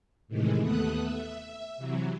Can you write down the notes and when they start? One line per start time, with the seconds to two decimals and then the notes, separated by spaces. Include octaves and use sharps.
0.28 A2 C3 D#3 E3 G#3
0.61 D#2 A3 B3 A4 D#6 F#6
1.01 E5
1.77 C3 E3 F#3